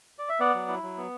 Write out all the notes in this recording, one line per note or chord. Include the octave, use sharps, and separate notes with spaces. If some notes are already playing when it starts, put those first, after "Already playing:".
D5
E5
B3 D5 F#5
F#3
E4
F#3
B3